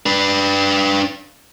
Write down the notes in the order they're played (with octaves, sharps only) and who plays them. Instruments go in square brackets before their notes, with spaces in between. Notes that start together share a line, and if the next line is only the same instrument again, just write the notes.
[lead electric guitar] D4 B4